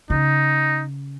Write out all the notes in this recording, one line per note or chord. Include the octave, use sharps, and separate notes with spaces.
C#3 D#4